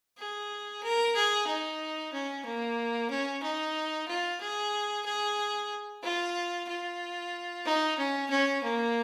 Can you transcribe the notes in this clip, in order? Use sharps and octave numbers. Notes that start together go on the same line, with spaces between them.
G#4
A#4
G#4
D#4
C#4
A#3
C#4
D#4
F4
G#4
G#4
F4
F4
D#4
C#4
C#4
A#3